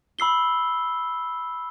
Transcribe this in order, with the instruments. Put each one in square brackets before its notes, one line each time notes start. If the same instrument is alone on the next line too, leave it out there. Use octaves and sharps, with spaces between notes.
[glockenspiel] B5 E6 C7 G7